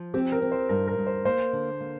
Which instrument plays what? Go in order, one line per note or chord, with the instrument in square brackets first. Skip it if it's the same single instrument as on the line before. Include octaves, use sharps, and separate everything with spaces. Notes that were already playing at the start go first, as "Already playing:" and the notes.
Already playing: [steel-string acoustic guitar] F3
[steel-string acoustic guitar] C4 [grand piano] G4
[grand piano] A#4
[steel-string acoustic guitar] C4
[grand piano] C5
[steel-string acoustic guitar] G2 [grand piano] A#4
[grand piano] A#4
[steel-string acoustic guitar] G2
[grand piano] C5
[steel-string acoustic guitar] A#3 [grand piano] C5
[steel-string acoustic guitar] D3
A#3